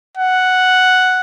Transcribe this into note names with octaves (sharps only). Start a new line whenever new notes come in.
F#5